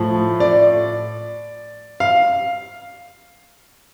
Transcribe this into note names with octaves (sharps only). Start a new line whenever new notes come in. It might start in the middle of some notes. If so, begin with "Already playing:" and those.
Already playing: A2 F3
D5
F5